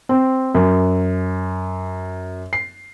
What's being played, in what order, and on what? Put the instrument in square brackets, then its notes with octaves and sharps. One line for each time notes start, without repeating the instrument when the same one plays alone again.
[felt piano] C4
F#2
C7